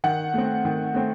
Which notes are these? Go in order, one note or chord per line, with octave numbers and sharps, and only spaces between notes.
D#3 F#5
A3 C4
D#3
A3 C4